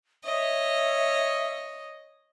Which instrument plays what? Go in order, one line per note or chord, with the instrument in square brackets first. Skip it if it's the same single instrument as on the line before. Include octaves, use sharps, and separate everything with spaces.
[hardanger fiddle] C#5 D#5 [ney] E5